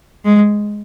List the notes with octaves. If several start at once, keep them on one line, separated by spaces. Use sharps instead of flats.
G#3